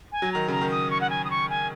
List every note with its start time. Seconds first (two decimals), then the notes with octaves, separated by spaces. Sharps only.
0.12 G#5
0.22 F#3
0.32 D#3 A#5
0.48 C#3 A#5
0.61 D#3
0.71 D#6
0.91 C#6
1.01 F#5
1.10 G#5
1.25 D#6
1.30 C#6
1.50 G#5